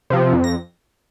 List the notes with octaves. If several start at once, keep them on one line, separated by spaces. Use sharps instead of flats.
C3 F3
F2
A#6